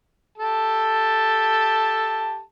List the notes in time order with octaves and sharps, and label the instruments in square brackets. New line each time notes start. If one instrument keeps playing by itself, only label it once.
[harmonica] G4 A4 A5